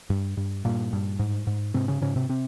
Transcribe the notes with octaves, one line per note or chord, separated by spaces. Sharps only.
G2
G2
G2 A#2 A#3
G2
G#2
G#2
G#2 C3 C4
C#3 C#4
G#2 C#3 C#4
C3 C4
C3 C4